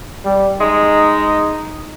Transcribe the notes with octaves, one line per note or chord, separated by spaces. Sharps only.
G3
G#3 D#4